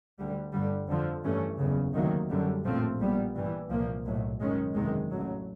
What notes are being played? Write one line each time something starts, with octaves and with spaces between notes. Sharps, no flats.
D2 D3 G3
G1 G2 D3 G3
F2 D3 F3
G2 E3 A3 C#4
F#1 E2 C#3
D2 C3 D#3 F#3 A#3
F#2 D3 G3
A#1 A2 F3 A3 C4
A#1 A#2 G3 B3
G2 E3 G3
C2 A#2 F3 A#3
B1 A2 F#3
F#2 D#3 G#3 C#4
F#1 E2 C3 D#3 G#3
A1 A2 F#3